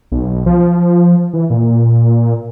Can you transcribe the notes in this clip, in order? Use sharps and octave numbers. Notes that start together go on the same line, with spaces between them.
B1
F3
E3
A#2